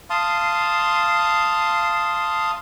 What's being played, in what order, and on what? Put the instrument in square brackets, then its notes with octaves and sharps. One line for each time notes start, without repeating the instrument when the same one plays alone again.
[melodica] F5 A5 C6 D#6